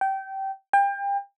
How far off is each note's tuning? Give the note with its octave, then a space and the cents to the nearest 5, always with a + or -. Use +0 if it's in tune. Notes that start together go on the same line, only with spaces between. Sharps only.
G5 -20
G5 +30